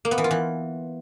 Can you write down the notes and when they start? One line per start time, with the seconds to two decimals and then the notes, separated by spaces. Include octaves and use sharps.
0.05 A#3
0.11 B3
0.18 E3
0.24 F4
0.31 E3